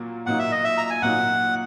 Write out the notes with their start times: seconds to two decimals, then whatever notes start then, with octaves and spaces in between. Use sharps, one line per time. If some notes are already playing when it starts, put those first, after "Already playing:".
Already playing: A#2 F#3 A#3
0.26 A#2 F#3 A#3 D#4 F#5
0.39 E5
0.52 D#5
0.64 E5
0.78 A#5
0.90 G#5
1.02 A#2 F#3 A#3 D#4 F#5